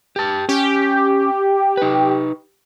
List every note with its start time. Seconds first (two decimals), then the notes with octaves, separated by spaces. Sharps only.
0.16 G4 A5
0.49 C#4 G4
1.77 D#4 B4